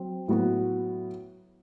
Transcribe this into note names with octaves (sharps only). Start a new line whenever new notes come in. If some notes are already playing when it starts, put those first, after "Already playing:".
Already playing: F#3 C4
A2 F#3 B3 F#4